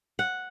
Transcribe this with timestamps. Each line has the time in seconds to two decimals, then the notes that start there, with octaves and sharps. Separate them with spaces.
0.19 F#5